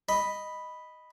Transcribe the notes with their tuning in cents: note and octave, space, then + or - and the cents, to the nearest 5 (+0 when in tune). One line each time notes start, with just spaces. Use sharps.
D#5 +0 B5 +0